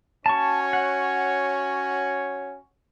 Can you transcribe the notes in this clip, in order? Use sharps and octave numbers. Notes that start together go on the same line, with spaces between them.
C#4 F#4 C#5 A5 C#6
F#5